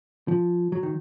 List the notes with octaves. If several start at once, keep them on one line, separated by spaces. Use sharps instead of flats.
F3
F#3
D#3